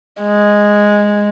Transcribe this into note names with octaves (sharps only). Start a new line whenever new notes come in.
G#3